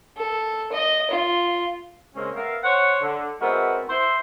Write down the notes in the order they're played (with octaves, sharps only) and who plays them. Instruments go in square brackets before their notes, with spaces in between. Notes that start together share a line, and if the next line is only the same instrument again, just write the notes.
[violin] A4
D#5
F4
[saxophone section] C#3 G#3 A#3 C4 C#4
B3 A#4 E5 F5
C5 C#5 F#5
D3
G#3 B3 C4 E4 F#4 A#4
E4 C5